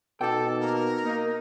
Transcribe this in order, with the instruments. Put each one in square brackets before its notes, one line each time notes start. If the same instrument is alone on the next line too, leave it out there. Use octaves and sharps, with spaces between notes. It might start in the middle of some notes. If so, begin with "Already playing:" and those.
[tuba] B2 [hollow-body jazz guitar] D#4 G5 [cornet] A4 [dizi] D6
[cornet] A#3 [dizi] A#4
[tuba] A#3 [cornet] D#4